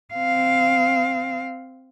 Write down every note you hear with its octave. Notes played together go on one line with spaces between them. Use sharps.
C4 F5